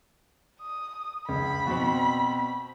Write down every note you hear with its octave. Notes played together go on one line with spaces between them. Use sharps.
D#6
C#2 B5
B2 C4